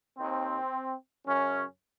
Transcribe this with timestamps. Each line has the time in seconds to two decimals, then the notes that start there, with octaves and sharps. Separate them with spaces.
0.18 D#2 D#3 C4
1.26 F#2 C#3 C#4